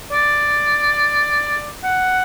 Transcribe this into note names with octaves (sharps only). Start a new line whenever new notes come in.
D5
F#5